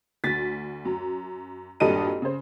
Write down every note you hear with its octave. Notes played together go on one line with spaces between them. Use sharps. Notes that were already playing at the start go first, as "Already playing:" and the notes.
D2 A6 B6
F#2
G#1 G2 A#2 A4 D#5 D#7
C#3 C5